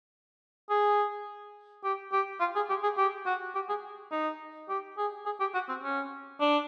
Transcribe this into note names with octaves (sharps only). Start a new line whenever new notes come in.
G#4
G4
G4
F4
G#4
G4
G#4
G4
F#4
G4
G#4
D#4
G4
G#4
G#4
G4
F#4
C4
C#4
D4